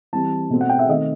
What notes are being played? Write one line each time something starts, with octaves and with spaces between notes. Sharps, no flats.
E3 G3 C4 A5
B2 A3 C4
F#5
G5
E5
D#3 A3 C4 D#5